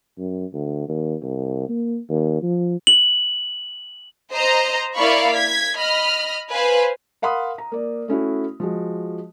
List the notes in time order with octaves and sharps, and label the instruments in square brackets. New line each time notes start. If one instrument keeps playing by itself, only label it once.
[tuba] F#2
D2
D#2
C2
A#3
D#2
F3
[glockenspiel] F#7
[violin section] C5 D#5 A#5
A#3 E4 D5 F5 B5 C#6
G#6 B6
D#5 B5 F6
B4 C5 F5 G#5
[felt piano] A#4 F5 F#5 B5 C6 D#6
A#5
A#3 D5
A3 C#4 E4 F#4
F3 G#3 F#4